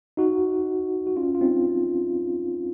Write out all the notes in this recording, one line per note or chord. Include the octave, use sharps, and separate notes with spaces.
D#4 F#4
F#4
C#4 F4
F4
C4 D#4